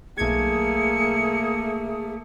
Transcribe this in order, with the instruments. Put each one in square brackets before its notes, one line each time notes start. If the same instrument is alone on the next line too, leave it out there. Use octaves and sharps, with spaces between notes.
[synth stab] B1 G#6 [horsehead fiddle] A3 A#3 [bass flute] G#4 [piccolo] C#7